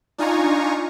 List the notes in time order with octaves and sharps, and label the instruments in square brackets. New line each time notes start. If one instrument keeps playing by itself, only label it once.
[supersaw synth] D4 D#4 F4 G#5 A#5 C#6